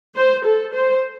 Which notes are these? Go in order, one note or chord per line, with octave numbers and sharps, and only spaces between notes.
C5
A4
C5